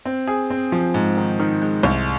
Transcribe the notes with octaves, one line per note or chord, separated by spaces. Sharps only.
C4
G#4
C4
F3
G#2
D#3
D#3
G#3
C2